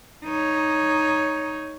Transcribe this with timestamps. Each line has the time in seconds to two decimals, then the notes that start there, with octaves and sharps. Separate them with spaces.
0.25 D#4 C#5